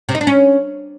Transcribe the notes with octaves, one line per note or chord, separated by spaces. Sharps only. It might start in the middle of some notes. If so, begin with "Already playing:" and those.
C3
D#4
D4
C#4